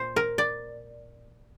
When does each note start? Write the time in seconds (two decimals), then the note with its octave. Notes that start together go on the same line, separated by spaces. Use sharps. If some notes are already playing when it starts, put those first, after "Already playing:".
Already playing: A#2 C5
0.16 A#4
0.38 D5